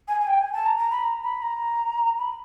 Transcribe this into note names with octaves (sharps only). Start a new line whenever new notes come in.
G#5
G#5
G5
G#5
A5
A#5
A#5
B5
A#5
B5
A#5
B5